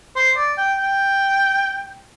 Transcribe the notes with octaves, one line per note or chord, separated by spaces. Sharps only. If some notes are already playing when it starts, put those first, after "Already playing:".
C5
D5
G5
G5